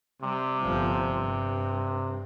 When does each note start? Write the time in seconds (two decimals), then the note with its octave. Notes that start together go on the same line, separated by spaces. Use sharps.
0.22 C3 G3
0.62 G1 F3
1.15 G2